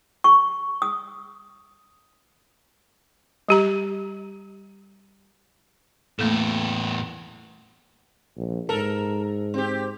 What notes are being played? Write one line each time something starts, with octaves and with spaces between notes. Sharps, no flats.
C#6
D#6
G3 G4 A#5
E2 A2 A3 A#3 A4
A#1
G#2 A4 A#4
C4 G4